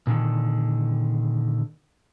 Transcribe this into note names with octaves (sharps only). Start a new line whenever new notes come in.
A#2 D3 D#3